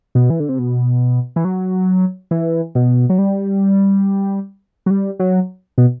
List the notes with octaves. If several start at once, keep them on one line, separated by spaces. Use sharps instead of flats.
B2
E3
D3
C3
B2
E3
F#3
E3
B2
F#3
G3
F#3
G3
F#3
B2